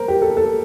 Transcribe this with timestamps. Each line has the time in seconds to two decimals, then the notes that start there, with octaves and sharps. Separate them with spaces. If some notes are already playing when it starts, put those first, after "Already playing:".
Already playing: A#4 C5
0.08 G4
0.22 A4
0.37 A4